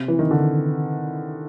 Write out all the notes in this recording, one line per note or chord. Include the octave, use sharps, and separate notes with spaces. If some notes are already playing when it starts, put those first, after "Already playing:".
Already playing: C3
E3
D#3
D3